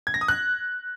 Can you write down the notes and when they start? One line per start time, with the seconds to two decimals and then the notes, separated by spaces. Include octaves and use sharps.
0.07 G#6
0.14 A#6
0.21 D#6
0.28 F#6